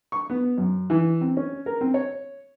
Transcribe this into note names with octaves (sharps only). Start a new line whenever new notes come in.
C#6
B3
F#2
E3
C4
C#4
A#4
C4
C#5